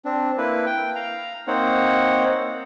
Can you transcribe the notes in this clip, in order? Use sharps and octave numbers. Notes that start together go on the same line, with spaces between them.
C4 D4
A#3 E4 B4
G5
F5 A#5
A#3 C4 D#4 C5 C#5 F#5